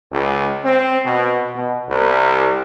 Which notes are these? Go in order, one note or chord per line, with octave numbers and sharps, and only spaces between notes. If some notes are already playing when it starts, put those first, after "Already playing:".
C#2
C4
B2
B2
C2